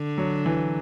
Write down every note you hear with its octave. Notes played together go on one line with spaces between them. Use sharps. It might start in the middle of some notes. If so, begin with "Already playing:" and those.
Already playing: D3
F#3
E3